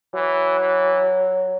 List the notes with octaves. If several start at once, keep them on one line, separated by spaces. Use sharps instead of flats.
E3 F#3
E3